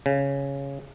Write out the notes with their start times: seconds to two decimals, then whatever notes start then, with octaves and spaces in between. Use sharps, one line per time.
0.06 C#3